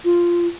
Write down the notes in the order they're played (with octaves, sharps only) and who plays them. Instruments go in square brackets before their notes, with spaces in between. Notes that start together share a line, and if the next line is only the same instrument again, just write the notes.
[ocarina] F4